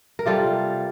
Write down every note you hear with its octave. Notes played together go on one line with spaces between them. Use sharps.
A#4
C3 G3 A#3 F4 A4